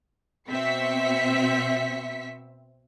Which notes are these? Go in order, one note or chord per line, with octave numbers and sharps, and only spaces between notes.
B2 C4 E5 B6 C#7